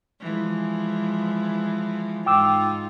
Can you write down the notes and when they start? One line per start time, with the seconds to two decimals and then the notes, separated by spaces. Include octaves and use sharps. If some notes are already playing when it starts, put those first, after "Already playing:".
0.20 E3 F3 G#3
2.26 G#2 D#4 F4 G5 D6 E6